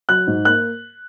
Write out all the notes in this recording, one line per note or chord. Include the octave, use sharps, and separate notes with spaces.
F#3 F#6
G#2
A#3 F#6